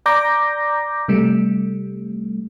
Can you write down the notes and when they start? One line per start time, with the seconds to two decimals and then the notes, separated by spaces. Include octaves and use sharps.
0.06 D5 A#5 D6 G6 A#6
1.08 C3 G3 A3